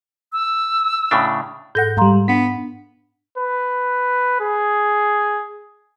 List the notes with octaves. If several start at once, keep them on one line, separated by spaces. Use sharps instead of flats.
E6
A2 C#3 D4
G#2 A4 F#5 G6 A#6
G#2 G3 F5 A#5 C6
B3 D4 B6
B4
G#4